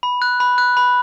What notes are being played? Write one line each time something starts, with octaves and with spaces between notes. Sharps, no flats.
B5
F#6
B5
F#6
B5